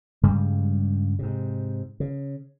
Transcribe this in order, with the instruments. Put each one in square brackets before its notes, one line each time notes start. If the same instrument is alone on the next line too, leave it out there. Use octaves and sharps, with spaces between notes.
[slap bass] G2 C#3 G3 G#3
G#2 C3
C#3